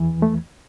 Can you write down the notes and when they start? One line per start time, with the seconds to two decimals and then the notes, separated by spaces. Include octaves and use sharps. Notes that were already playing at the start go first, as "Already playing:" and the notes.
Already playing: E2 E3
0.22 A3